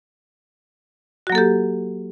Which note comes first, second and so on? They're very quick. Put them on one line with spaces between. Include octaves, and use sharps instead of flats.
F#4 F#3 A#3 A4 G4